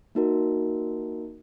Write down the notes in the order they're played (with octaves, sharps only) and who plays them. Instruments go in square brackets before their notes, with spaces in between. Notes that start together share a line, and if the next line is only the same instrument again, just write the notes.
[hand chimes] A#3 D#4 F#4 A#4